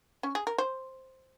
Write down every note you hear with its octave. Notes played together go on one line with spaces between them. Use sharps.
C#4
G#4
A#4
C5